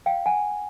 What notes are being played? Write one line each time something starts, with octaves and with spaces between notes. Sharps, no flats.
F5 G5
F#5 G#5